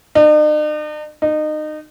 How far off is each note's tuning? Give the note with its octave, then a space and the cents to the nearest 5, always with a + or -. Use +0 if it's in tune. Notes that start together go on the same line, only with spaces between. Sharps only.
D#4 -45
D#4 -25